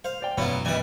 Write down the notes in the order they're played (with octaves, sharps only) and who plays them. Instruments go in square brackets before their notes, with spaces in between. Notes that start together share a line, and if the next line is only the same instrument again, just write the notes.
[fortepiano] C5 [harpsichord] F5
[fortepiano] C5 D5 G5
[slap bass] E1 F#2 D3 [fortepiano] B2 [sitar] F#3 E4 [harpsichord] B3 F4
[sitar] D#3 E3 G3 [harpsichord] B4 G#5